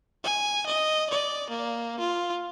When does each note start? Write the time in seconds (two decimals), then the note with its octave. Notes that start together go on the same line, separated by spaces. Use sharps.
0.24 G#5
0.66 D#5
1.10 D5
1.50 A#3
2.00 F4